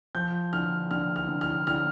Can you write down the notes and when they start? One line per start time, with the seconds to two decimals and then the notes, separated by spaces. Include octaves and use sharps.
0.15 F3 G6
0.53 D3 F6
0.91 D3 F6
1.16 F6
1.28 D3
1.41 F6
1.67 D3 F6